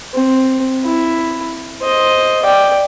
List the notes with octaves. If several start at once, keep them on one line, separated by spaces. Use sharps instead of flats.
C4
E4
C5 D#5
D5 G5